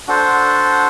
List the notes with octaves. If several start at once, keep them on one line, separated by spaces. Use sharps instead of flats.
D4 F#4 A4 C5